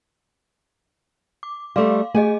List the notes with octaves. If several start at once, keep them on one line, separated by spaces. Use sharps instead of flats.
D6
G3 A3 F5 C6 D6
A3 G#4 D#5 G#5